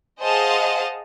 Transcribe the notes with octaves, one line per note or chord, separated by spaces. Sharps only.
G#4 C5 D#5 F5 F#5 A5